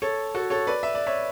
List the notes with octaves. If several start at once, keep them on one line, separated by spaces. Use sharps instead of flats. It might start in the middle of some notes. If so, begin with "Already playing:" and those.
A4 C#5
F#4 A4
A4 C#5
B4 D5
E5
D5
C#5 E5